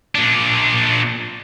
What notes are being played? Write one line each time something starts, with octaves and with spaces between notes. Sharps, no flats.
A#2 D4